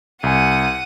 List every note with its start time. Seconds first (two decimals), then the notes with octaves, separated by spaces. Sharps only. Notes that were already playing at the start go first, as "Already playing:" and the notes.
0.23 C2 F#5 G#5 D#7